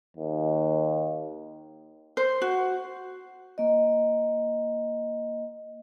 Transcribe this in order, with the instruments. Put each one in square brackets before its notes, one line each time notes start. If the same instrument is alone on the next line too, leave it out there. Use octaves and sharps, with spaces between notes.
[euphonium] D#2
[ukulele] C5
F#4
[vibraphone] A#3 D#5